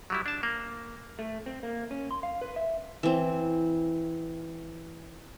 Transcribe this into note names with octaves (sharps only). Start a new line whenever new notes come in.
F#3 G3 E4
D4 A5
A#3
A3
C4
A#3
C#4
C6
F5
B4
E5
E3 C4